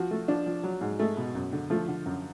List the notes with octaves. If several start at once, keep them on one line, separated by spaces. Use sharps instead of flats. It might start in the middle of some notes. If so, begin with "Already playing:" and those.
Already playing: F3 F#4
A3
F3 D4
F3
F#3
G#2
G#3 A3
B2
F#2
D3
F3 A3
D3
F#2